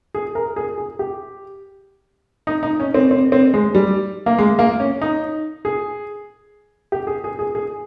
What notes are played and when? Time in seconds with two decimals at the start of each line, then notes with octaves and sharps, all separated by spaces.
0.15 G#4
0.35 A#4
0.56 G#4
0.78 G#4
0.99 G4
2.47 D#4
2.63 D#4
2.80 C#4
2.94 C4
3.11 C4
3.32 C4
3.54 G#3
3.75 G3
4.26 A#3
4.38 G#3
4.59 A#3
4.80 C#4
5.02 D#4
5.65 G#4
6.92 G4
7.07 G#4
7.24 G#4
7.39 G#4
7.55 G#4